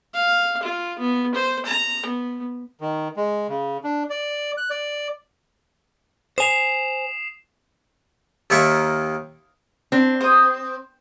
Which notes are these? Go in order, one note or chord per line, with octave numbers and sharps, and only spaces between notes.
F5
F4
B3
C5
A#5
B3
D#3
G#3
C#3
D4
D5
F#6
D5
C5 G#5 D#6 C7 E7 F7
D#2 D#3 A#3 E5 C#6
C4 D4
C5 D#6